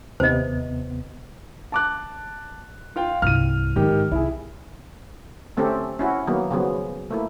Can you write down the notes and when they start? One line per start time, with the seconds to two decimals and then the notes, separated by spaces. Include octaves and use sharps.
0.20 D#2 C3 B3 C5 D#5
1.72 A5 D6 F#6
2.96 F4 F5 G5
3.22 C2 G2 F6 D#7
3.76 G#2 D3 D#3 G4
4.11 C2 E4 G#4
5.57 D3 A3 C4 C#4 G4 A4
5.99 C#4 E4 F#4
6.27 D#3 F#3 A#3 B3
6.51 C#3 F3 F#3 B3
7.11 A3 A#3 E4